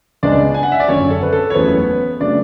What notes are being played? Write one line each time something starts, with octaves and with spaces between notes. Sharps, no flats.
C#2 C#3 G#3 B3 D4 D5
G#5
F#5
E5
D5
G#1 F#2 D3 C#4 C#5
A4
B4
A4
C#5
F#1 E2 C#3 F#3 A3 B3 B4
C#3 F#3 A3 D4 D5